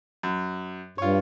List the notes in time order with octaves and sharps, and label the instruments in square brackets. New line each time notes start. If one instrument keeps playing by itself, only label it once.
[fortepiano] F#2
[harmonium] G2 [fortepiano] F4 C#5